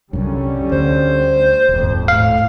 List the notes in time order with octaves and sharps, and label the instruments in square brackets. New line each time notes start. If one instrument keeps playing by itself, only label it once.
[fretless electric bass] C2 F#2 [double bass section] D3 G3 C#4
[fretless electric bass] D2 [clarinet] C5
[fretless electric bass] D#1 [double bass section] G#1 F2
[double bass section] A2 [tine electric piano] F5